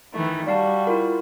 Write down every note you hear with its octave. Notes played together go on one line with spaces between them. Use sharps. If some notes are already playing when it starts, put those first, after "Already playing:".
D#3 E3 A3
G3 F#4 D5 F5 A5
E4 F4 A#4